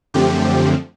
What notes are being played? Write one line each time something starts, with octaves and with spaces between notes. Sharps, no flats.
F#2 D3 F3 A3 C4 G4